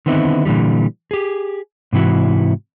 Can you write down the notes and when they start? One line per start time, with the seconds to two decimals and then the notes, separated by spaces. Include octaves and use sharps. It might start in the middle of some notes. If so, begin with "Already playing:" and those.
0.06 D3 D#3 B3 C4 D#4 E4
0.45 A#2 D3 E3 G3
1.11 G4 G#4
1.93 G#2 C3 E3 E4 F#4